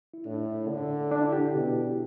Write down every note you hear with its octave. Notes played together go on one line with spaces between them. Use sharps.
E4
A2 D4
D3
D4
E4
G4
B2